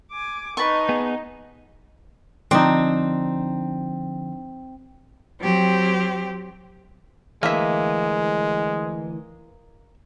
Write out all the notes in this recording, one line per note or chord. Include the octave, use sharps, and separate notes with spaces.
G#5 D6
D#4 B4 A5 C#6
B3 G#4
D3 F3 C4 D4 D#4
F#3 C4 G4
D2 E3 G#3 A#3 E5